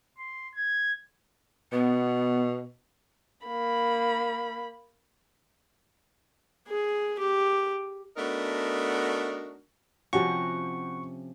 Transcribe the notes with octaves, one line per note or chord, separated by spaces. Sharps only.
C6
G#6
B2 B3
A#3 B5
G#4
G4
A3 B3 D4 D#4 F#4 A#4
C3 F3 C#4 F#4 G4 C#6